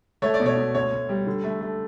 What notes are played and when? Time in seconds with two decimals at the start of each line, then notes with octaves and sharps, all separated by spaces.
0.22 A3 C#5
0.34 D5
0.40 B2
0.46 C#5
0.57 B2
0.74 D2 C#5
0.92 D2
1.09 G3
1.26 D3
1.44 A3
1.61 A3